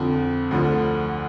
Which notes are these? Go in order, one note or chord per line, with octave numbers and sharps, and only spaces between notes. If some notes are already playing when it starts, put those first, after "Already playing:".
Already playing: F2 D3 F3
D2 D3 F3